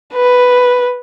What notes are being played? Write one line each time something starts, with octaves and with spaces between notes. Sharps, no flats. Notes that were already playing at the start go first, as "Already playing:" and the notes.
B4